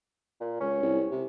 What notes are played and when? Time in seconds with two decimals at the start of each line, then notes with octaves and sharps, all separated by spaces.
0.40 A#2
0.61 C#2 C#4
0.83 C2
1.11 C3